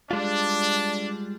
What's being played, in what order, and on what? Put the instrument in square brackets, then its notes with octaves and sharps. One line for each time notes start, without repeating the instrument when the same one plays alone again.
[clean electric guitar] G3 G#3 F4 [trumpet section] D4